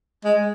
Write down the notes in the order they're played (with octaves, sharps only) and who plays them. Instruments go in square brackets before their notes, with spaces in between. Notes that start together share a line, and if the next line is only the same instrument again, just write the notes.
[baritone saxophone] G#3